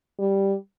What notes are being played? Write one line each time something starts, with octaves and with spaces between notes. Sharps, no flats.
G3